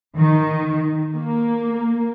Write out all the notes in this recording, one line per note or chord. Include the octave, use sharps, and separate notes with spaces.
D#3
A#3